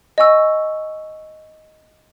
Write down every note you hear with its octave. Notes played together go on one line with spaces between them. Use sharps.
D#5 G#5 C#6 E6